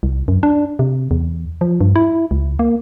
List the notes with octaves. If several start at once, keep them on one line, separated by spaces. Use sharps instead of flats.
C2
F#2
D4
C3
E2
F3
G2
E4
C#2
A#3